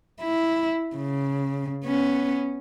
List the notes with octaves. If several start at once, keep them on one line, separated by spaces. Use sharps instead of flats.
E4
C#3
B3 C#4